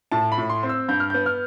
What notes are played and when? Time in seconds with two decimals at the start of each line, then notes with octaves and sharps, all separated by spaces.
0.12 A2 A5
0.32 B5
0.38 A2
0.50 C6
0.63 C4
0.69 E6
0.88 G2 G6
1.00 F6
1.10 B3 G6
1.26 F6